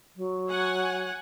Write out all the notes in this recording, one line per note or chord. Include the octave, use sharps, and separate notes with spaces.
F#3
C#5 F#5 G#5